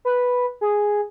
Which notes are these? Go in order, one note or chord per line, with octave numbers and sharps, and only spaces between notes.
B4
G#4